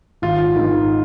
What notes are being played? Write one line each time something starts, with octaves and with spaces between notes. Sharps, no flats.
G#1 F4
G#2 D#3